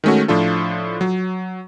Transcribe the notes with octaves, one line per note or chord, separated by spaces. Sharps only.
D#3 G#3 A3 C#4 F#4
A2 F3 D4 F4 A4
F#3